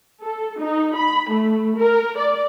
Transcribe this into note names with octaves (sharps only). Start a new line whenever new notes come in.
A4
D#4
B5
A3
A#4
D5